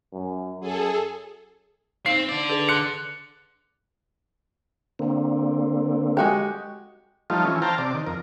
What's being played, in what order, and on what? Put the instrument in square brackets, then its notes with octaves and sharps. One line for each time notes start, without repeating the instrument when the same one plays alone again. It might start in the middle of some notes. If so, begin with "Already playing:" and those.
[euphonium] F#2
[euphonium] F#2 [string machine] G#4 A4
[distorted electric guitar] C4 [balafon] D#4 F5 [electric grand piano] C7
[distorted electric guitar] D3 D5
[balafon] G#4 A4 B4
[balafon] C6 [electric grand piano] F#6 C#7
[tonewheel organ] D3 A#3 C4
[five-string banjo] G#3 F#4 G4
[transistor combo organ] F3 G3 A3 D#4 F4
E3 C#4
C5 F5 G5 A5 A#5
C3 D5
D#3
F2 A#4